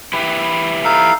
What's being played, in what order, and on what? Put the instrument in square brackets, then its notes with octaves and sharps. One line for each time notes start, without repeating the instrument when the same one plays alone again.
[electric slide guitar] E4 G4 B4
[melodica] D#4 A4 F5